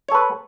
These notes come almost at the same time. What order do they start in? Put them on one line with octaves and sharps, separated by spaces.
C#5 A4 B4